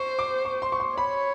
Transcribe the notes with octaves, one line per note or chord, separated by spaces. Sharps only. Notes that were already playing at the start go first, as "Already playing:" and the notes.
Already playing: C5 C#6
D6
C#6
C6
C#6
C6
C#5 B5